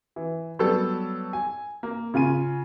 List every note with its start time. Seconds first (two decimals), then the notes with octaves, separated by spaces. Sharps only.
0.16 E3
0.59 F#3 G3 B3 A4
1.33 G#5
1.83 A#3
2.14 C#3 F4 G#5 D#7